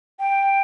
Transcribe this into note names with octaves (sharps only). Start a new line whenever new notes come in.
G5